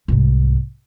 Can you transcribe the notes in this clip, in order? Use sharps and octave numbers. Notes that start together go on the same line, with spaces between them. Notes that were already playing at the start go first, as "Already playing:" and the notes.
C2 G#2